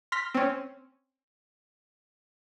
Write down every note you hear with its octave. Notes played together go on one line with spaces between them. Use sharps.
C6 F6 A#6 B6
C4 C#4